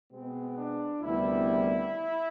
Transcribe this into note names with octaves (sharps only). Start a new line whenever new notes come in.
B2 G#3 B3 C4
D4
D2 C3 D#3 G3 B3 E4